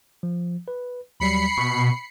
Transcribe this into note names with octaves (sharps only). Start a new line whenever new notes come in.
F3
B4
D#2 F#3 G3 B5 C7 C#7
B2 C#6